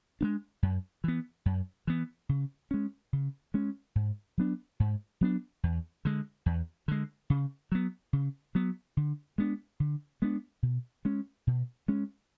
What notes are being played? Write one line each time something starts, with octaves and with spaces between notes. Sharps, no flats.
G#3 B3 D4
F#2
E3 B3
F#2
E3 B3
C#3
G#3 C#4
C#3
G#3 C#4
G#2
F#3 B3 D4
G#2
F#3 B3 D4
E2
D3 G#3
E2
D3 G#3
C#3
F#3 B3
C#3
F#3 B3
D3
G#3 B3 D4
D3
G#3 B3 D4
B2
G#3 C#4
B2
G#3 C#4